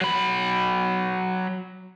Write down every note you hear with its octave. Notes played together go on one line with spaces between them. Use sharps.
F#3 B5